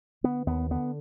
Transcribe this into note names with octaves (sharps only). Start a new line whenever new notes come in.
D3 B3
D#2 B3
D3 B3